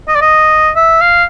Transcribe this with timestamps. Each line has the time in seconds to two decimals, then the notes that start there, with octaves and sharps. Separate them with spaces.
0.08 D#5
0.16 D5
0.22 D#5
0.76 E5
1.01 F5